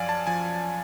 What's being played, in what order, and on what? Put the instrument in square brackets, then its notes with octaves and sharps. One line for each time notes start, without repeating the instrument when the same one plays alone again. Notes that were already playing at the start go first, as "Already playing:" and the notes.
Already playing: [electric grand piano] F#2 F3 D5 F5 G#5
A5
F3 G#5